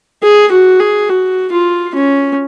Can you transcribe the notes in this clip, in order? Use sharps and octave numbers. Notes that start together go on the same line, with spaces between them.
G#4
F#4
G#4
F#4
F4
C#4